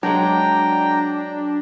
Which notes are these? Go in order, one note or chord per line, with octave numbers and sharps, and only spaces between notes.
F#3 G#3 D4 G5 A#5